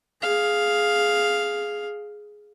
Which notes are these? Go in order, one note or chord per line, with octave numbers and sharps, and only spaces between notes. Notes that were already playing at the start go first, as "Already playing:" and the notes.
G#4 F5